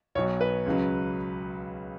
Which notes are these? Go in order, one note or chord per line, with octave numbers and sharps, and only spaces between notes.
B1 B2 F#3 C#5
B4
C#2 C#3 F#3